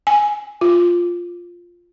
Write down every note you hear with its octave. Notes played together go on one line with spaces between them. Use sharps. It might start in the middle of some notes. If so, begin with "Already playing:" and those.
G#5
F4